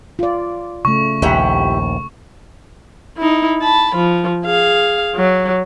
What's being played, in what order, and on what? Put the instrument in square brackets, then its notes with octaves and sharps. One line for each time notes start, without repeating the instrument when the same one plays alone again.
[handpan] F4 D5
[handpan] C#3 A3 [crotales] C#6
[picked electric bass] A#1 D#2 [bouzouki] E4 G4 F#5
[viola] D#4 E4
A5 B5
F3
G#4 F5
F#3